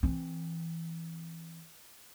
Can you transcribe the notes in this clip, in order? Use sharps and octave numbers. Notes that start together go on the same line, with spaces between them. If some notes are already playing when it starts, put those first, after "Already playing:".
E3 C4